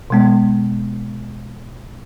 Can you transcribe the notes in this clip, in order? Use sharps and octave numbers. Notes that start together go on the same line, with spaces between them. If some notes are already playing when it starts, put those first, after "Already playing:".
B2 G#3 B3